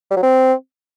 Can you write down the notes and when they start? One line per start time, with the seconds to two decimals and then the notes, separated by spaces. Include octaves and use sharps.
0.11 G3
0.17 F#3
0.22 C4